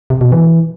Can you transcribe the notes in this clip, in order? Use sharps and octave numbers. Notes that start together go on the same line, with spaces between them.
C3
B2
E3